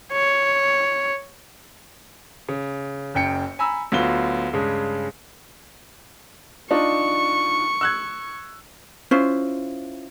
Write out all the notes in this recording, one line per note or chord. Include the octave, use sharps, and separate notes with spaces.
C#5
C#3
F#1 F#2 G5 C#7
G#5 A#5 B5 E6
D2 F#3 B3 F4 G7
G2 C#3 G#3
D4 D#4 F4 C#6
E6 F#6 G#6
C#4 E4 F4 C5